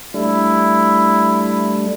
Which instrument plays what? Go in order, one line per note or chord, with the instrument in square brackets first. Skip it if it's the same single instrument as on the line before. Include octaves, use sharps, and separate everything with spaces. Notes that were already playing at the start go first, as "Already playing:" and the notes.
[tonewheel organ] G3 A3 D4 [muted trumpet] E4